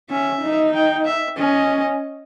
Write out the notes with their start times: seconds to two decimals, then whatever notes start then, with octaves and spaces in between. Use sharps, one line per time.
0.10 C#4 E5
0.42 D#4
0.74 G5
1.06 E5
1.38 C#4 D#5